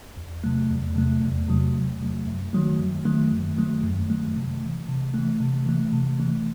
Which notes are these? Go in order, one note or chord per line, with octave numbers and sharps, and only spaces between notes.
E2
C3 F#3 A3
E2
C3 F#3 A3
E2
C3 F#3 A3
E2
C3 F#3 A3
F#2
D#3 F#3 A3
F#2
D#3 F#3 A3
F#2
D#3 F#3 A3
F#2
D#3 F#3 A3
C3
E3 A3
C3
E3 A3
C3
E3 A3
C3
E3 A3